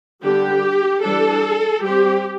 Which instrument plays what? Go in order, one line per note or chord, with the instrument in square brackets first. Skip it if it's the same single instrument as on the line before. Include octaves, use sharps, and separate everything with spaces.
[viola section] D3 G3 B3 D4 G4
E3 G3 D4 A4
G3 C4 G4